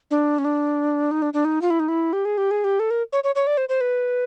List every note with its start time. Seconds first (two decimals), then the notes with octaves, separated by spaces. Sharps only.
0.11 D4
0.39 C#4
0.45 D4
1.11 D#4
1.22 D4
1.33 D4
1.45 D#4
1.62 F4
1.70 E4
1.80 D#4
1.88 E4
2.13 G4
2.25 G#4
2.38 G4
2.51 G#4
2.64 G4
2.80 A4
2.90 A#4
3.13 C#5
3.24 C#5
3.35 C#5
3.47 D5
3.57 C5
3.69 C5
3.81 B4